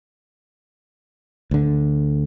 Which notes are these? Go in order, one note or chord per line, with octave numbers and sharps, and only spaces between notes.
D2 D3